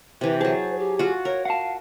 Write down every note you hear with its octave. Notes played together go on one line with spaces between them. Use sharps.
C3 E3 B4
F#3 G#4 C5 A5
G4
F4 F#4
A#4 C#5
F5 F#5 A5